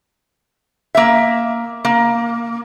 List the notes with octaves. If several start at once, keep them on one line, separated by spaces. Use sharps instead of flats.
A#3 E5
A#3